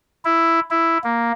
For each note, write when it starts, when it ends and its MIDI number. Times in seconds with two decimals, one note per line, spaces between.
0.25 0.60 64
0.71 0.98 64
1.04 1.32 58